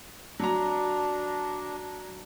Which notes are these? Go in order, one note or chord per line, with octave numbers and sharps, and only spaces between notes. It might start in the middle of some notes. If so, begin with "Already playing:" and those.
F#3 D4 A#5